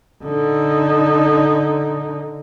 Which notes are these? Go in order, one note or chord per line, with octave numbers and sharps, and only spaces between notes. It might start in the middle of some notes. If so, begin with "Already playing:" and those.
D3 D#4